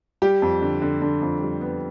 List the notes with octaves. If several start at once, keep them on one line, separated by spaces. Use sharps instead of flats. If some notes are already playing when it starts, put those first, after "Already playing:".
G3 G4
F2
D3
D3
D3
F2
G3
B3